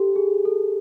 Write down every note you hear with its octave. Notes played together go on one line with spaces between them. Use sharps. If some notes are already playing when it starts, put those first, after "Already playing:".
Already playing: G4 A4
G#4
A4